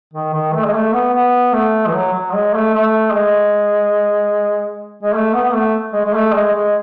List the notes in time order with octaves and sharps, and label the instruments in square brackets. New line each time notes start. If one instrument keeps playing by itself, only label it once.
[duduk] D#3
D#3
A3
G#3
A3
B3
B3
A3
E3
F#3
F#3
G#3
A3
A3
G#3
G#3
A3
B3
B3
A3
G#3
G#3
A3
G#3
G#3